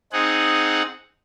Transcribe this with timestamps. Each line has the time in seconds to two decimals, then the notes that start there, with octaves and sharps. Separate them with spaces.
0.13 C4 D#4 G#4 F#5